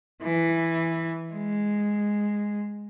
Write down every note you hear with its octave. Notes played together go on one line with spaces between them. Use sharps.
E3
G#3